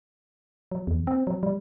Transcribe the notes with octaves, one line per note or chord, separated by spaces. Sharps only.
F#3
E2
C4
F#3
G3